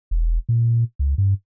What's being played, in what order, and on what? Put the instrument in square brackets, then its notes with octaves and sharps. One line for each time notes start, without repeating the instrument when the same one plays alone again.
[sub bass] E1
A#2
C#2
G2